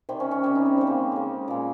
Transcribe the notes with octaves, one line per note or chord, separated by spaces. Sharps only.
C3 D#3 G3 C4
C#4
C#4
C3 D#3 G3 C#4
D#4
C4
C#3 G#3 C4
A#3
C#3 G#3
A#2 G#3